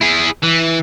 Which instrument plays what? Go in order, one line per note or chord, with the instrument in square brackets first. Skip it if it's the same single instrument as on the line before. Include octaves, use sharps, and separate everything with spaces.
[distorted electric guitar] E4 G#4
E3